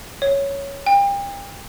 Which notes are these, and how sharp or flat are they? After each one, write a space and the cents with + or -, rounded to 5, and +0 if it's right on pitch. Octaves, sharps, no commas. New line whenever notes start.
C#5 +5
G5 +35